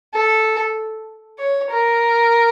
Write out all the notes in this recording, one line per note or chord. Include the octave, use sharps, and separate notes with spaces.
A4
C#5
A#4